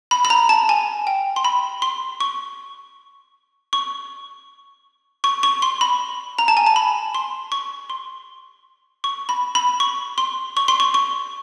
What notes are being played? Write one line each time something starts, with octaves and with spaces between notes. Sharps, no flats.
B5
B5
A#5
A5
G#5
G5
C6
B5
C6
C#6
C#6
C#6
C#6
C6
B5
A#5
A5
G#5
A5
B5
C6
C#6
C6
C#6
B5
B5
C#6
C6
C#6
C6
C#6
C#6